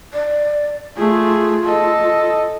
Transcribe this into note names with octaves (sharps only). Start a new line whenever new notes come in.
D5
A3 F4 G#4
A4 D#5